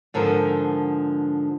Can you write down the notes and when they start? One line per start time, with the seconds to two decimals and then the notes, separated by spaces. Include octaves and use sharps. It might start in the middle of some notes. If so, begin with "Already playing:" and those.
0.14 G#2 D3 F3 B3 A#4